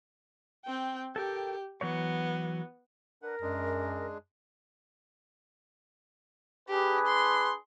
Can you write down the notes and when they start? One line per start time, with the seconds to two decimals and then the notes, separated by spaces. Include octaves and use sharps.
0.65 C4 G5
1.16 G4 A4 A#4 G5
1.81 E3 F#3 B3 C#5
3.22 D4 A#4 B4 F#5
3.42 F#2 G#3 D4 G#4
6.69 D4 G4 G#4 B4
7.07 C6